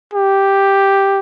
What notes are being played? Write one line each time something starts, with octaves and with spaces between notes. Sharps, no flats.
G4